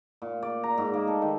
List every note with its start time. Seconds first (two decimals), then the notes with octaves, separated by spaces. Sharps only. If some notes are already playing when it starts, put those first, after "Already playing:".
0.22 A#2
0.43 D5
0.64 A#5
0.78 G#2
0.93 A#3
1.07 A4
1.22 D#3